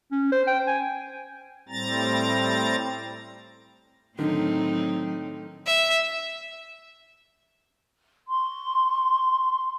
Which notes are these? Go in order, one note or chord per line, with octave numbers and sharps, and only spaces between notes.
C#4
C5
G5
G#5
A2 G3 C4 A#5 A6
A2 D3 D#3 F#3 C4 D#4
E5
C6 C#6